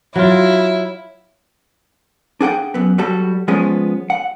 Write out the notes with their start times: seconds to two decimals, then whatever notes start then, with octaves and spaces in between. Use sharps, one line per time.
0.16 F#3 E4 F4
2.41 D4 G#4 F#5 G5
2.74 F#2 B3
2.98 F#3 G3 F#4 A4
3.48 F3 G#3 B3 C#4 G#4
4.10 F#5